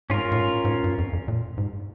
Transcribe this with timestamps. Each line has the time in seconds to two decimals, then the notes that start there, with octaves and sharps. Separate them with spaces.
0.10 G#2 C#4 F4 A#4
0.32 A2
0.40 G#2
0.65 G#2
0.69 A2
0.84 G2
0.98 F2
1.13 F2
1.28 A#2
1.58 G#2